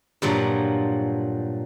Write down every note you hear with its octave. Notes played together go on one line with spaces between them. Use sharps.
G2 A#2 F3 F#3